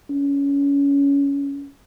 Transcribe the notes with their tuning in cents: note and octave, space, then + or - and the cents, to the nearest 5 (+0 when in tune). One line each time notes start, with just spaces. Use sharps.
C#4 +20